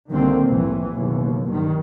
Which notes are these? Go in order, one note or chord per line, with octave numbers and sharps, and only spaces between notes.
C2 D3 D#3 A#3 C4
C2 F2 A2 E3
F#1 D#2 B2
G2 D#3